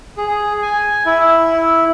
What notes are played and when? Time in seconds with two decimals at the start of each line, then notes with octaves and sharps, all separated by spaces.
0.18 G#4
0.62 G#5
1.06 E4